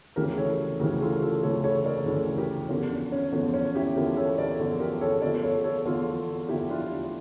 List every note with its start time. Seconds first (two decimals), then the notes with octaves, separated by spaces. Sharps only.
0.16 D2 C#3 E3 G4 A#4
0.37 A4 C#5
0.80 D2 C#3 E3 G4 A#4
1.01 F4 A4
1.22 F4 A4
1.43 D2 C#3 E3 A4 C#5
1.64 A4 C#5
1.85 A#4 D5
2.06 D2 C#3 E3 A4 C#5
2.38 G4 A#4
2.69 E2 D3 F3 C#4
2.90 D4
3.12 C#4
3.32 E2 D3 F3 C#4
3.54 C#4
3.75 E4 G4
3.96 E2 D3 F3 G4 A#4
4.17 A4 C#5
4.38 A#4 D5
4.59 E2 D3 F3
4.80 G4 A#4
5.01 A4 C#5
5.22 E2 D3 F3 A#4 D5
5.43 A4 C#5
5.64 A4 C#5
5.85 E2 D3 F3 F4 A4
6.49 E2 D3 F3 E4 G4
6.69 D4 F4
6.90 D4